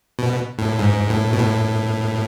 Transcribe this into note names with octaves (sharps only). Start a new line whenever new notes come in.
B2
A2
G#2
A2
B2
A2